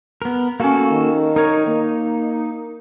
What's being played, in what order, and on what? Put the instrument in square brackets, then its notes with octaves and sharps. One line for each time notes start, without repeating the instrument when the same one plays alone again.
[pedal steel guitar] B3 A#4
[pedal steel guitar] A#3 F#4 A4 [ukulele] C#4 F5
[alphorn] D#3
[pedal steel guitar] D#4 [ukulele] A#4 C#5
[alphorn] A#3